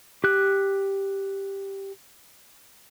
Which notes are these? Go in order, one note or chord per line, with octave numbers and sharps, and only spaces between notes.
G4 F#6